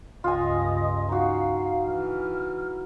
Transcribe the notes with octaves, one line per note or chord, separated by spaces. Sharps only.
C#2 G2 F4 D#5 G#5 D#6
D#4 F#4 F5
E3 F6